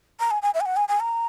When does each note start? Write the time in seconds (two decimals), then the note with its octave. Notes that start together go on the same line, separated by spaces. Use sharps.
0.20 A#5
0.31 G#5
0.42 G#5
0.54 E5
0.60 G#5
0.66 F#5
0.76 G#5
0.88 G#5
1.00 A#5